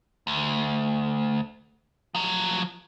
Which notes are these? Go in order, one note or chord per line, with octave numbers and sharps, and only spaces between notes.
D2
F3 F#3